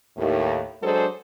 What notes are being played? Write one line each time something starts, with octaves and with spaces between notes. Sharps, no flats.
D#2 A2
F#3 G#3 D4 G#4 A4 C5